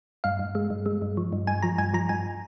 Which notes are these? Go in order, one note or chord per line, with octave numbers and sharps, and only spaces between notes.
G2 F5
G2
G#3
G2
G#3
G2
F3
G2
G2 G#5
F3 A#5
G2 G#5
F3 A#5
G2 G#5